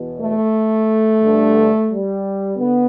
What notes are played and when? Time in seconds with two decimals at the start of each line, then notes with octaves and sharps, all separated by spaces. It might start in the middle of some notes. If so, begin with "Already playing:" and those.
Already playing: E2 B2
0.21 A3
1.22 G2 D3
1.90 G3
2.57 D3 B3